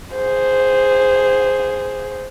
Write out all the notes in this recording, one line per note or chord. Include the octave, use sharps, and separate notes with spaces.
G#4 C5